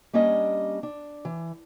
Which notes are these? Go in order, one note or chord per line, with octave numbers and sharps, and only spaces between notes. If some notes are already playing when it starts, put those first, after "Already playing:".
G3 A#3 C#4 D4 D#5
D4
E3